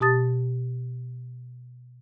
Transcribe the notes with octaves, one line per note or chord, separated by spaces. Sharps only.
B2 G4 A5 D#6 A6